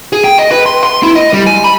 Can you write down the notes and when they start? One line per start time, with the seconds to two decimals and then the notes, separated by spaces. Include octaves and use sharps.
0.13 G#4
0.24 G5
0.39 D#5
0.51 B4
0.66 C6
0.83 C6
1.03 E4
1.16 D#5
1.33 G3
1.47 G#5
1.64 B5